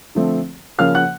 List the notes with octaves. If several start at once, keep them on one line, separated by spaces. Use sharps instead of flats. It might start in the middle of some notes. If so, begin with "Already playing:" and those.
D3 F3 A3 C4
C#3 F3 A#3 C#4 F5 F6
F#5 F#6